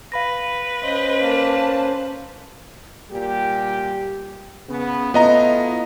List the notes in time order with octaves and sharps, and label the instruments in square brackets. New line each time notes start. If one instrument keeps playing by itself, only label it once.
[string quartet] B4 [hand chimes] F5 B5 A#6
[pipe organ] C#4 C5 [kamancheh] D#5
[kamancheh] A#3 A5
[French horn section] A#2 G3 G4
C#3 B3
[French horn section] A3 E4 F4 [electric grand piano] B3 D#5 A#5